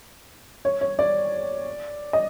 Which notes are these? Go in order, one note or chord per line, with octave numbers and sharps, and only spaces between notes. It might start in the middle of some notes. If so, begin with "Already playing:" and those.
C#5
C#5
D5
D#5